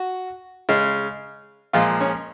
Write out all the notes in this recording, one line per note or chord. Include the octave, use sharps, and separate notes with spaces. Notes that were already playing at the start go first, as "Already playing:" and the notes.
Already playing: F#4
C#3 G#3
A#2 F3 G#3 F4
C#4